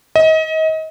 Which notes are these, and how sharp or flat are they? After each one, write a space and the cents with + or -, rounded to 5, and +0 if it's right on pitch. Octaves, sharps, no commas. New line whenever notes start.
D#5 +30